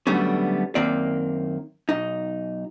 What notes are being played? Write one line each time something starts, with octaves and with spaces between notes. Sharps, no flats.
D3 F#3 G3 A3 B3 C#4
F#2 D#3 A#3 C4 D5
B1 D#4